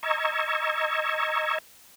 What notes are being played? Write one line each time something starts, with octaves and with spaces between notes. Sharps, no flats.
D#5 A#5 C#6 E6 G#6